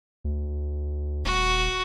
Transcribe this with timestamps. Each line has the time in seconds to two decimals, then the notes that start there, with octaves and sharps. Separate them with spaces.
0.24 D2
1.25 D#1 F#4